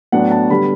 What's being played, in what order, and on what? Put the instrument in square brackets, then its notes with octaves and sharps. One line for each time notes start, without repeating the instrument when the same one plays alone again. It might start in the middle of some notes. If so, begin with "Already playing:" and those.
[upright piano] A2 F#3 B3 D4 F#5
A5
D3 G3 B3 B5